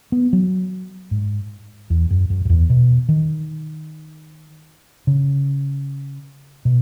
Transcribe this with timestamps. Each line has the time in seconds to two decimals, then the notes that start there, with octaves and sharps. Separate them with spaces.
0.12 B3
0.33 F#3
1.11 G#2
1.90 E2
2.10 F#2
2.30 F#2
2.45 F#2
2.50 E2
2.70 B2
3.09 D#3
5.07 C#3
6.65 B2